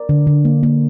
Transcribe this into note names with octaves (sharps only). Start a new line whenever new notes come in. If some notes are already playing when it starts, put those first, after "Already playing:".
Already playing: A#4 D5
D3
D3
A#3
A#3